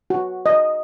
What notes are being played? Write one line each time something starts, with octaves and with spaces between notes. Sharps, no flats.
F#4
D#5